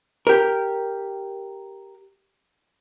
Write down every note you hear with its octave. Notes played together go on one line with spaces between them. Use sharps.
G4 A#4